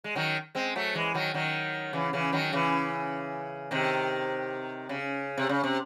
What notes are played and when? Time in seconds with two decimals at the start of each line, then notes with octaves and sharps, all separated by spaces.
0.04 G#3
0.15 D#3 F#3
0.55 G#3 C4
0.76 F#3 A3
0.95 E3 G#3
1.14 D#3 F#3
1.34 D#3 F#3
1.93 C#3 E3
2.13 C#3 E3
2.33 D#3 F#3
2.53 C#3 E3
3.71 C3 D#3
4.89 C#3
5.38 C3
5.49 C#3
5.64 C3